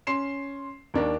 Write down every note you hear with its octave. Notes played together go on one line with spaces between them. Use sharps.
C#4 C6 C7 E7
D#2 D4 A#4